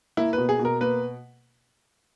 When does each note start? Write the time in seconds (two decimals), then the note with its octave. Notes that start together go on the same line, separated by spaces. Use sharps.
0.17 A#3 E4
0.33 B4
0.38 B2
0.49 G#4
0.59 B2
0.65 A#4
0.81 A#3 B4